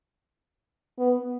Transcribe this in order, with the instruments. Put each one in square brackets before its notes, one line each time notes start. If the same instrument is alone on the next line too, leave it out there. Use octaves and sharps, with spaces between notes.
[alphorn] B3